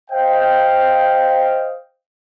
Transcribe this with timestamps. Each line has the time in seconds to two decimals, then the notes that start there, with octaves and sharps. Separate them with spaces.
0.11 C5 D#5 F5 G5